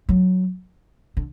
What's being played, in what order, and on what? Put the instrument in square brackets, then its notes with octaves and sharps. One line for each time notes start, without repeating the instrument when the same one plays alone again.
[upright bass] F#3
D3